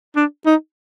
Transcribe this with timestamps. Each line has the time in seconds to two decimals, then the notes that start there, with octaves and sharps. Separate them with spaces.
0.16 D4
0.46 D#4